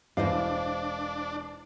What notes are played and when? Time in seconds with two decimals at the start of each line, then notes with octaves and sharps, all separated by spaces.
0.17 E1 E3 D4 E4 C5 D#5 F5